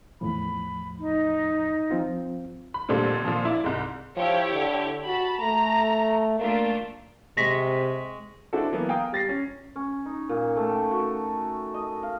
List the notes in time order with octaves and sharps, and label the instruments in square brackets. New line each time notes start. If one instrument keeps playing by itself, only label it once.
[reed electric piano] E2 A2 F3 [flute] B5
[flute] D#4
[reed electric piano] F3 C4 F4
[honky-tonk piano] B5
F2 A#2 D3 G3 A3 C4
A#2 F3
E4 D5
C2 G#2
[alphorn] F3 [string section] E4 G4 C#5
[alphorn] D3
[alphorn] F#4 [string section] A5 B5
[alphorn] A3 [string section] A#5
[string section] A3 D4 F4 [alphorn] A#3
[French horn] C3 [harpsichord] G#3 C#6 [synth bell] A#6 B6
[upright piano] G#3 C4 D4 E4 F#4 A4
E3 F#3 A#3 B3
F5 G5 G#5 A#5 D#6
G3 A6 A#6 C7
C#4
[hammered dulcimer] C#4
D#4
A#2
A3
G5
F#4
D#5
F5